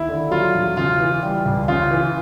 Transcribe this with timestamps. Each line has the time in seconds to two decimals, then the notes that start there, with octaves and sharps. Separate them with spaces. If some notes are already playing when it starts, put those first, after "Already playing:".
Already playing: D#2 E4
0.08 D3
0.31 F#3 F4
0.55 E1
0.77 C#3 F4
1.00 E3
1.23 G3
1.46 C#2
1.68 C#3 F4
1.91 E3